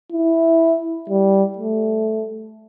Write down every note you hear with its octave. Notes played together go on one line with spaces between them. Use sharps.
E4
G3
A3